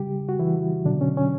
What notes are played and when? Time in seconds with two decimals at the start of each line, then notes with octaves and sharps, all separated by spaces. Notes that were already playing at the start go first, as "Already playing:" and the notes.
Already playing: C#3 G3 G4
0.29 F#4
0.39 E3 E4
0.85 B2 D3 F#3 D4
1.01 C#4
1.17 C#4